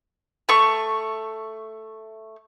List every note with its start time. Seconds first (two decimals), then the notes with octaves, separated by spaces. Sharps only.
0.49 A3 C#6